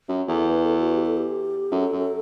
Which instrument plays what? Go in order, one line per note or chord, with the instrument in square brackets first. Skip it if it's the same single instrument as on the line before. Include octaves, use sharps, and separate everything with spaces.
[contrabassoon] F#2
[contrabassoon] E2 [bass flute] A4
[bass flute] B4
A4
F#4
G4
A4
G4
[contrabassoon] F#2 [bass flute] A4
[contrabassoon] F#2